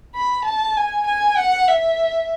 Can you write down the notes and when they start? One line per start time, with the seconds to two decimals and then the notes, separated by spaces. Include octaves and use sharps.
0.15 B5
0.45 A5
0.77 G#5
1.07 G#5
1.37 F#5
1.68 E5